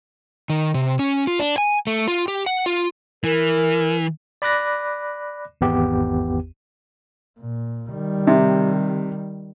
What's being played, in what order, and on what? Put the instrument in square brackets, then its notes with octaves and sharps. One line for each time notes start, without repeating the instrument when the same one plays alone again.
[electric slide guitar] D#3
C3
C#4
F4
D4
G#5
A3
F4
G4
F#5
F4
[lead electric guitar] E3 [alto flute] A#4
[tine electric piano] D5 B5 D6 F#6 A#6
G#1 E2 B3 G4
[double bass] A#2
D#3 G3
[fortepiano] C3